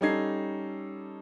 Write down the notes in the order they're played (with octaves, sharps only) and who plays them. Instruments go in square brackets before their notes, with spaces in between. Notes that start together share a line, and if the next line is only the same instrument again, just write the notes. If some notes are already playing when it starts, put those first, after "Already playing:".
[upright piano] G3 C#4 D#4 A4 G#6 C7